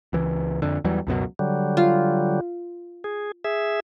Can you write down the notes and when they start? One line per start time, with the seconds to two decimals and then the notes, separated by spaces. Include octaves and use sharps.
0.13 C#2 E3
0.62 F2 D3
0.84 E2 E3 F#3 G3
1.07 C#2 F#2 B2 F#3
1.39 D3 F#3 G3
1.77 F4
3.04 G#4
3.44 G#4 E5